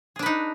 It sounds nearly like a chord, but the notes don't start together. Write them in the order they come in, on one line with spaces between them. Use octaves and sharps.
G#4 D4 B4 D#4